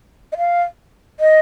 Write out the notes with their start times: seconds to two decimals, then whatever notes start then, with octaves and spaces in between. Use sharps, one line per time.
0.32 D#5
0.38 F5
1.20 D#5